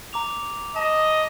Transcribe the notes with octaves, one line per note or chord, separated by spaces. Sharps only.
A#5 D6 F7
D#5 A5